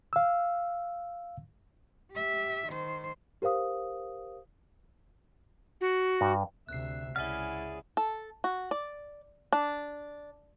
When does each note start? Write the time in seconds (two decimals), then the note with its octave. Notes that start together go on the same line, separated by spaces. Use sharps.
0.13 F5 E6
2.11 G4 E5
2.68 D#3 C5
3.42 G4 A#4 C5 F5 D#6
5.80 F#4
6.21 G2
6.69 D2 C3 E5 F#6 C7
7.16 C#2 C#4 E4 G#4 D5 E5 F#5 F6
7.97 A4
8.44 F#4
8.71 D5
9.53 D4